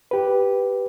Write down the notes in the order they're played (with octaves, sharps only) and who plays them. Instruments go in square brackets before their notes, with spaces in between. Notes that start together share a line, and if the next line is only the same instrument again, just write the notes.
[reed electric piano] G4 B4